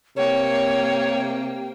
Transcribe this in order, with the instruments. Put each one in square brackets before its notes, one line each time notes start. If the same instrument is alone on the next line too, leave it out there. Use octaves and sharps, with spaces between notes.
[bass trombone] C3 [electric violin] A#3 G5 [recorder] C#5